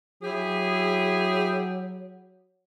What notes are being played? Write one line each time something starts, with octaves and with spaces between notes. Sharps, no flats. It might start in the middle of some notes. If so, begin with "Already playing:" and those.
F#3 E4 G4 G#4